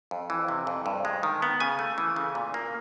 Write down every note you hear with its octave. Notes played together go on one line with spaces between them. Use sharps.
F2
E3
C3
F2
G2
G#3
D#3
B3
C#3 G#5
A3
E3
C#3
A#2
A#3